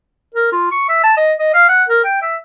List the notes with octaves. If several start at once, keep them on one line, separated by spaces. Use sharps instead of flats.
A#4
F4
C#6
E5
A5
D#5
D#5
F5
F#5
A#4
G5
E5